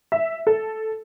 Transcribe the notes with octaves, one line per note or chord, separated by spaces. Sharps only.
E5
A4